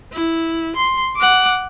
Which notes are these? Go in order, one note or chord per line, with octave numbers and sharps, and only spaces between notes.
E4
C6
F#5 D6